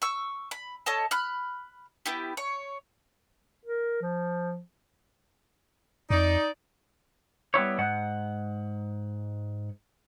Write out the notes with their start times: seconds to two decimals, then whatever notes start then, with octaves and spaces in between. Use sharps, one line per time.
0.02 C#6 E6
0.51 B5
0.86 A4 C#5 D#5 A5
1.11 B5 F6 F#6
2.06 B3 E4 G4
2.37 C#5
3.65 A#4
4.02 F3
6.10 F2 D#4 D5
7.54 G3 B3 E4 C#5
7.78 G#2 G#3 F#5